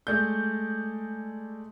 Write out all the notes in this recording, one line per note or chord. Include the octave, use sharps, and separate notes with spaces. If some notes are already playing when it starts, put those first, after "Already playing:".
G#3 A3 D5 G6